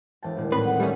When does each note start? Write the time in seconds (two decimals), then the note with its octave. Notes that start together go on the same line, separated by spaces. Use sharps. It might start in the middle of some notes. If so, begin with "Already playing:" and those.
0.22 E1 G5 A5
0.37 D#1 A#2 G#3
0.52 A2 C4 B4
0.65 F#5
0.80 G3 A3 C#4